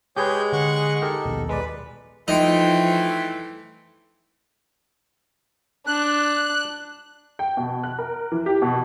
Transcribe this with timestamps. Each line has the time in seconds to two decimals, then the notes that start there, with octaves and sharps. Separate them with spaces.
0.17 G#3 G4 G#4 B4 C#5 G6
0.53 D3 F#5 C#6
1.02 D#4 G4 A4 A#4
1.25 A#1 D#2 B2
1.49 G#3 B4 D5
2.28 E3 F3 A3 D#4 G5 C6
5.87 D4 F#6
7.39 G5
7.57 B2
7.84 F#6
7.99 A#4
8.32 E3
8.46 G4
8.62 B2